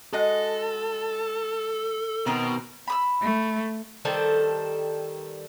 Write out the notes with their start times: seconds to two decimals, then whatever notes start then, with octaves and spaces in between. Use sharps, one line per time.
0.13 G#3 F#4 A4 D#5
2.26 B2 D#3 C4 A#4
2.88 B5 D#6 E6
3.22 A3
4.05 D#3 G3 A4 C5